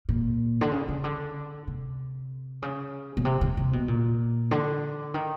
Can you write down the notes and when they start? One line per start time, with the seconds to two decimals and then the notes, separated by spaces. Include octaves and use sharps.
0.09 A#2
0.61 D3
0.72 C#3
0.88 C#3
1.04 D3
1.67 C3
2.62 C#3
3.17 B2
3.25 C3
3.41 C3
3.57 C3
3.73 B2
3.88 A#2
4.51 D3
5.14 D#3